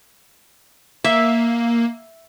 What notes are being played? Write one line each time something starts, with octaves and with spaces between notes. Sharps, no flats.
A#3 E5